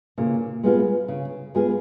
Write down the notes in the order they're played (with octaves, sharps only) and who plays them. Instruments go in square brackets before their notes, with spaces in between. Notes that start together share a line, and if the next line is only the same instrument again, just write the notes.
[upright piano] A#2 A#3 [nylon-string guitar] C#3
[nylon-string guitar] G#3 B3 F4 G#4
C#3
G#3 B3 F4 G#4